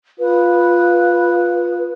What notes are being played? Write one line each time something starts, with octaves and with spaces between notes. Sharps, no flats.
F4 B4